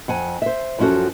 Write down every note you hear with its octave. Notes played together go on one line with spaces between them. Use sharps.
F2 F#5 G#5
C5 E5
F#2 F3 C#4 E4 F#4 A4